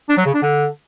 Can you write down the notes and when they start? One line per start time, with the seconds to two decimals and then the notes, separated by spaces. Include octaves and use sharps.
0.09 D4
0.17 F#3
0.26 C#3
0.34 D4
0.42 D3